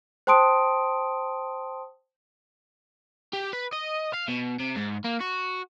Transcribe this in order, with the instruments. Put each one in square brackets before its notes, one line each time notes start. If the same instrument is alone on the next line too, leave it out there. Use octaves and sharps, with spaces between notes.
[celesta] C5 G5 A5 C6 D#6 D7
[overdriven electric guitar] G4
B4
D#5
F5
B2
C3
G#2
A#3
F#4